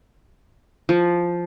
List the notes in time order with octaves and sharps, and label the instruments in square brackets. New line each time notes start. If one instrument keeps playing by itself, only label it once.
[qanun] F3